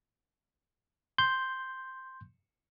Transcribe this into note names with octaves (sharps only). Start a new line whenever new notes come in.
C6 G6